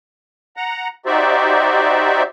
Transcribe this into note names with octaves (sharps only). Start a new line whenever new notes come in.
F#5 A#5
D#4 F#4 G4 C5 D5 E5